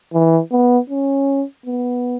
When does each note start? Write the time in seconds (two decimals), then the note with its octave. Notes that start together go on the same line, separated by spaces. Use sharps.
0.13 E3
0.52 B3
0.90 C#4
1.66 B3